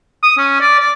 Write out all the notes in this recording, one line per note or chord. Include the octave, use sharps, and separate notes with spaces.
D#6
C#4
D5
D5